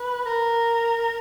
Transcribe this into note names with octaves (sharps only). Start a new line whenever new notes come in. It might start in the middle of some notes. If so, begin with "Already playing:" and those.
Already playing: B4
A#4